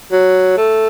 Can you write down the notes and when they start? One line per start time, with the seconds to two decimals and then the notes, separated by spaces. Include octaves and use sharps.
0.12 F#3
0.57 A3